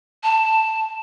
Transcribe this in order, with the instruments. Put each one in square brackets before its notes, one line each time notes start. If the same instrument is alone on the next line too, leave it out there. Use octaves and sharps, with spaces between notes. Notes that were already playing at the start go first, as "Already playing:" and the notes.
[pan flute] A5